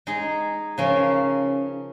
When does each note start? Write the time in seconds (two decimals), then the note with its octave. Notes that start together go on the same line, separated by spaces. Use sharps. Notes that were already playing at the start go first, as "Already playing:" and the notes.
0.07 G#3 D#4 G#4
0.78 C#3 F3 C#4 A#4